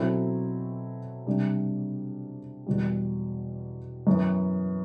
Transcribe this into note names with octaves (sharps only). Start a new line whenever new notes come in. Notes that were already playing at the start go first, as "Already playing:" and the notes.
Already playing: B2 F#3 C4 E4 A4
C3 G3 D4
E2 B2 G3
F#2 E3 B3